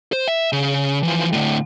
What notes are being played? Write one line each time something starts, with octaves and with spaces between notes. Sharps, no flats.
C5
E5
C#3
E3 F3
A2 D3